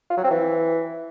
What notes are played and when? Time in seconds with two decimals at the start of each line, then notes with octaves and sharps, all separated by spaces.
0.10 F4
0.17 F#3
0.24 C4
0.30 E3